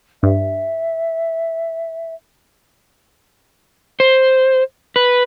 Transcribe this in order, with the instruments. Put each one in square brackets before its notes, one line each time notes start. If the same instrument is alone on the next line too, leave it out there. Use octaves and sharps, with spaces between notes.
[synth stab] G2 [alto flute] E5
[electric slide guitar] C5
B4